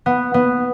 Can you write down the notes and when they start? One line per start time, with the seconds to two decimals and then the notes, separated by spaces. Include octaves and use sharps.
0.06 B3
0.34 B3